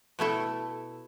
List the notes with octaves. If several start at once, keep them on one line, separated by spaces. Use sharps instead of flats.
B2 A3 E4 A4